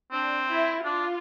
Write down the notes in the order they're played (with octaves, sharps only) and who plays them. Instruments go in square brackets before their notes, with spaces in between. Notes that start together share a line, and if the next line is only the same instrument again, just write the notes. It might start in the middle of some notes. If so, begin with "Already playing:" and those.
[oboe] C4 [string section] D4
[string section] E4
[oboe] D4 [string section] F4